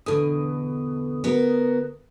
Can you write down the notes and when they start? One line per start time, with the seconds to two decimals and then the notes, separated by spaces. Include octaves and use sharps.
0.06 E2 B2 D3 A4 D#6
1.24 B3 F#4 A#4